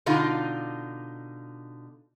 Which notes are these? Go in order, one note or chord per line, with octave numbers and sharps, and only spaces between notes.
B2 D3 D#4 F4